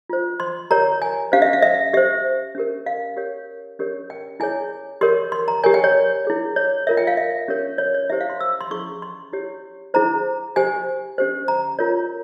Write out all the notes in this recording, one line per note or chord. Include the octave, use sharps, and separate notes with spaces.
F4 C5
C6
G4 A#4 C#5 A#5
G#5
C#4 G4 C5 F5
E5
F5
E5
G4 C5 E5
C#4 G4 A#4
F5
G4 A#4 C#5
C#4 G4 A#4 C#5
G5
E4 G#4 C#5 G#5
G4 A#4 C#5 C6
C6
A#5
G4 A#4 C#5 G#5
G5
C#5
E4 G#4 C#5
C#5
F4 A#4 C#5 E5
G5
F5
E5
C#4 G4 A#4 C#5
C#5
C#5
E4 G4 C5 E5
F5
C6
E6
C6
C#4 E4 G#4 C#6
C6
E4 G4 C#5
E4 G#4 C5 A#5
G4 C5 G#5
C#4 G4 C5
A#5
F4 A#4 C#5